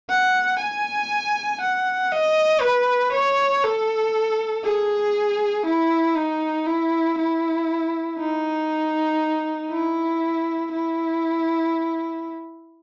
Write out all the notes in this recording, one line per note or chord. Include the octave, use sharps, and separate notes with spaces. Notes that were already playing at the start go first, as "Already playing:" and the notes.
F#5
G#5
F#5
D#5
B4
C#5
A4
G#4
E4
D#4
E4
E4
D#4
E4
E4